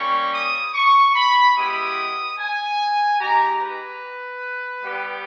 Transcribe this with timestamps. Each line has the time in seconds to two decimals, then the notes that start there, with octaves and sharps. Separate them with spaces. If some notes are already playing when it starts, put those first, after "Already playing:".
Already playing: G3 A#3 C#4 C#6
0.32 D#6
0.74 C#6
1.14 B5
1.55 G#3 B3 E4 G4 D#6
2.37 G#5
3.19 G#3 D#4 G4 A#5
3.60 B4
4.83 G3 B3 G4